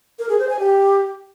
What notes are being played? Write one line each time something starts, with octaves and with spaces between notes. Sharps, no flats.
A#4
G#4
C5
G#5
G4